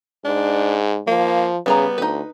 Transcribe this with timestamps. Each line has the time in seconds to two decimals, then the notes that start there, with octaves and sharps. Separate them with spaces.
0.25 G#2 D4
1.07 F3 A#3
1.66 C#3 G3 B3 G#4 A#5
1.98 D2 D#4 B4